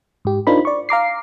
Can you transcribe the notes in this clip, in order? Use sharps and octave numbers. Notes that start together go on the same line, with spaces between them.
G#2 G4
D4 D#4 F4 A#4 C5 B5
D5 C#6
F5 A#5 D6 C7